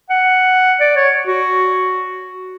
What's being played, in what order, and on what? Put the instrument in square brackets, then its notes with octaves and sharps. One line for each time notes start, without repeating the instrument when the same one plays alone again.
[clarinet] F#5
D5
C#5
F#4